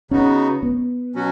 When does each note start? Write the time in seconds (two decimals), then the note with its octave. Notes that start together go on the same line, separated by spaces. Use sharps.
0.11 C#3 B3 C#4 D#4 F#4
0.63 B3
1.15 B2 F#3 C#4 F#4